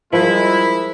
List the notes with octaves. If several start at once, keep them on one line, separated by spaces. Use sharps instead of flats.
F3 G3 G#3 E4 A#4